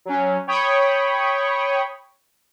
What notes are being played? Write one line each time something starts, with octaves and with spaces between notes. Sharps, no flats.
F#3 C#4
C#5 G5 B5 C#6 D#6